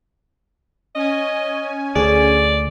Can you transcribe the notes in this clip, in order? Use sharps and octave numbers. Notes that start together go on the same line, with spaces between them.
C#4 D#5 G#5
D2 G#4 D5